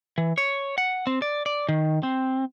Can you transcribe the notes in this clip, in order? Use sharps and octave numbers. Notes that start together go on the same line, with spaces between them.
E3
C#5
F#5
C4
D5
D5
D#3
C4